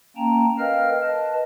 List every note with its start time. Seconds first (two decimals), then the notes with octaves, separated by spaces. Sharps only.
0.17 A#3 C#4 G5 A5 A#5
0.58 A#4 B4 D#5 F5 G5 F6
1.03 B4 D#5 A5